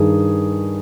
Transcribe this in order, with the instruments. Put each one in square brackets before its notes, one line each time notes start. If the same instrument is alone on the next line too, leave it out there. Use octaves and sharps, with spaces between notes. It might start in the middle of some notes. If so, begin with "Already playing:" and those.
Already playing: [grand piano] G2 D#3 G#4